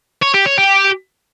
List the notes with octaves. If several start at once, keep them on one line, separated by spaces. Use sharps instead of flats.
C#5
G4
C#5
G4